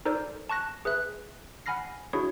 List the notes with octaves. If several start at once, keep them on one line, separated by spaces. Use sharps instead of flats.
D#4 A4 A#4 C5 D5
A5 C#6 F#6 A#6
G#4 B4 E5 F#6
F#5 G#5 B5 F6 A#6 C7
D4 E4 F#4 G#4 C#5